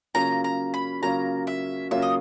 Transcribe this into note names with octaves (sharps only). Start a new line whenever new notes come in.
C#3 F#3 A#3 C#4 F4 A#5
A#5
B5
C#3 F#3 A#3 C#4 F4 A#5
E5
C#3 F#3 A#3 C#4 F4 E5
D#5